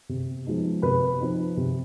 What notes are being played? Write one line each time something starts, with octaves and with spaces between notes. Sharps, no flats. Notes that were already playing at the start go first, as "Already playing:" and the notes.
C3
F3 G#3 B3 D#4
C3 B4 B5
F3 C4 D#4
C3